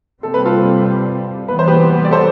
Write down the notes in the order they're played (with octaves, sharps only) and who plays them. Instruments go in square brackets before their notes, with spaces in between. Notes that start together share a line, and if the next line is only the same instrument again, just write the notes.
[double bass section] C3 G3 C4 [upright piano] A4
[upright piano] B4
F4 A4
[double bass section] E3 G3 B3 [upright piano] B4
[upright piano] C5
G4 B4
D5
A4 C5